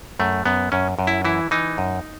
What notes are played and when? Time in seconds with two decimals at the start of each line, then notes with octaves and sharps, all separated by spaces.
0.20 F#2 A3
0.46 F#2 B3
0.72 F#2 C#4
0.99 F#2
1.07 E4
1.25 E3 E4
1.51 E3 D#4
1.78 F#2